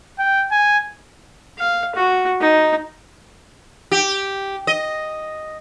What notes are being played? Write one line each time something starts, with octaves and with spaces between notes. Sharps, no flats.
G5
G#5
F5
F#4
D#4
G4
D#5